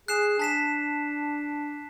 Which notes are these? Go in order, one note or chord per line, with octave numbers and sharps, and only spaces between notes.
G#4 F#6 C7 E7
D4 A5 B6 E7